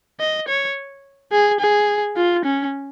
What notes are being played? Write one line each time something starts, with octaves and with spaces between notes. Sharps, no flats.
D#5
C#5
G#4
G#4
F4
C#4